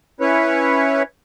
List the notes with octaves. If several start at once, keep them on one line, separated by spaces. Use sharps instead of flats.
C#4 E4 B4 C#5